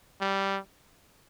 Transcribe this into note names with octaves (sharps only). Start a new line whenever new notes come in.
G3